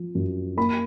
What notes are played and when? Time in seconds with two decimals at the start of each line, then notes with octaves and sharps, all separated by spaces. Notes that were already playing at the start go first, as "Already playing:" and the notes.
Already playing: F3
0.15 F#2
0.57 A#3 B5